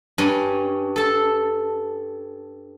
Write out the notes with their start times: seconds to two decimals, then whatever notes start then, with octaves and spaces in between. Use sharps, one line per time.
0.18 G2 C#4
0.96 A4 A5